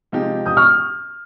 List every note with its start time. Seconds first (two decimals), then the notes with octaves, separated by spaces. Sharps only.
0.12 C3 F3 G#3 D#4 G4
0.46 D#6 G6
0.57 C#6 F6